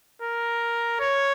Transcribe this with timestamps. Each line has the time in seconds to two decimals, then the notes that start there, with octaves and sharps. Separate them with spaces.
0.22 A#4
1.00 C#5